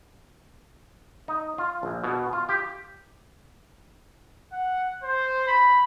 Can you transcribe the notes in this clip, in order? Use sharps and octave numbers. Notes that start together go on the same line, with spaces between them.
D#4
F4
A#1
B2
F4
G4
F#5
C5
B5